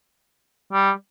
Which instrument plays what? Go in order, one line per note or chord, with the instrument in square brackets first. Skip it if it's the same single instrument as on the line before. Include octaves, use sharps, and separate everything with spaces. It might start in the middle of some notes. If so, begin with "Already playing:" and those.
[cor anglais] G3